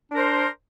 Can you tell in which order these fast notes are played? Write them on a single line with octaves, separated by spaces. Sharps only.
D4 A#4 C5